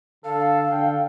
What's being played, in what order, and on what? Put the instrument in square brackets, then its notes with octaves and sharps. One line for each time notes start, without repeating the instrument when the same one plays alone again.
[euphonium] D3 [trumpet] A4 [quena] F5
[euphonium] D3 [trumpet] G5